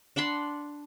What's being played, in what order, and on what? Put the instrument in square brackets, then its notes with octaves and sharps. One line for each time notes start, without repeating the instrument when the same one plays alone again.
[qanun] D4 F#5 B5 C6